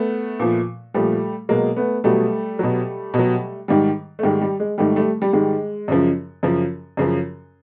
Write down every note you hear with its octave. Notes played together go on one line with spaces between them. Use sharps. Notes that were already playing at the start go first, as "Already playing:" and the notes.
Already playing: A3 B3
A#2 F3
A#2 F3 G3 A3
B2 F#3 G#3 A#3
A3 B3
B2 F#3 G3 A3
B2 F#3
B2 F#3
G#2 D#3 G3
A3
G#2 D#3 G3 G#3
G3
G#3
G#2 D#3 G3 A3
G3 A3
G3
G#2 D#3 G3 G#3
F#2 C#3 F3
F#2 C#3 F3
F#2 C#3 F3